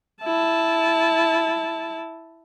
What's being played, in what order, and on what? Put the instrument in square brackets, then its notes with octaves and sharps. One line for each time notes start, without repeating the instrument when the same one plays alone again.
[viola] E4 A5